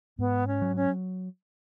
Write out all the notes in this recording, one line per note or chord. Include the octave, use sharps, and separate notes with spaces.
G#2 B3
C#4
F#3
C#4